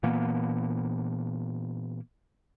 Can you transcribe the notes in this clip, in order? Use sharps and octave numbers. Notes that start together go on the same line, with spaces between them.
A#2 E3 A#3 B3